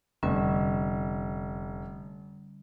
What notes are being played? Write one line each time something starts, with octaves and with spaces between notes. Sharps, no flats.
F1 D3 G3 C#4